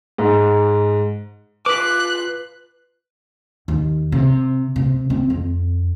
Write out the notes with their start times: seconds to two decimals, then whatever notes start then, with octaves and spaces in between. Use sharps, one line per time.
0.18 G#2
1.66 F4 B4 D6 F#6 B6
3.68 D#2
4.12 C3
4.76 C3
5.10 C4
5.30 F2